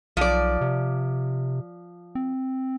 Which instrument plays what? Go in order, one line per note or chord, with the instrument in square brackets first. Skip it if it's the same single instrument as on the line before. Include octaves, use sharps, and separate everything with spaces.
[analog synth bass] B1 [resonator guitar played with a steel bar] F3 D5
[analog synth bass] C3
C4